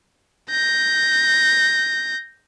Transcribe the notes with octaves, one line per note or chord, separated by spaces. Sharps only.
G6 A#6